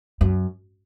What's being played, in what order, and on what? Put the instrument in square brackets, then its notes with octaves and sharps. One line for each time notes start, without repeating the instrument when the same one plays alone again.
[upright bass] F#2